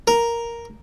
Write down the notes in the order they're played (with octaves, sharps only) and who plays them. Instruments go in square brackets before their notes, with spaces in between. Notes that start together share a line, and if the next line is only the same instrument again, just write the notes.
[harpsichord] A#4